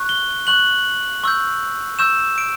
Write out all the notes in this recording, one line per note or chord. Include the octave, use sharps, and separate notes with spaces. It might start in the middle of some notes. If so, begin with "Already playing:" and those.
Already playing: C#6 F#6
G7
C#6 F#6 F#7
C#6 E6 G6
C#6 E6 G6 E7
D7